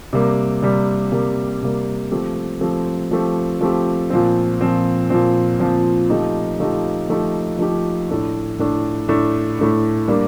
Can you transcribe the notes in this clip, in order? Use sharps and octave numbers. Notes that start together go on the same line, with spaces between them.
C3 G3 A#3
C3 G3 A#3
C3 G3 A#3
C3 G3 A#3
F3 A3 C4 G4
F3 A3 C4 G4
F3 A3 C4 G4
F3 A3 C4 G4
A#2 F3 C4
A#2 F3 C4
A#2 F3 C4
A#2 F3 C4
F3 A3 D#4 G4
F3 A3 D#4 G4
F3 A3 D#4 G4
F3 A3 D#4 G4
A2 A3 D4
A2 A3 D4
A2 A3 D4
A2 A3 D4
G3 A#3 D4